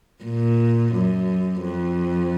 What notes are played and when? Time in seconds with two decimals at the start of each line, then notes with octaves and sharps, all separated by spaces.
0.24 A#2
0.93 F#2
1.61 F2